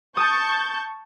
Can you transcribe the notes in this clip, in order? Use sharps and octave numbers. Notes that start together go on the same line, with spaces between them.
A5 C#6 D#6 G6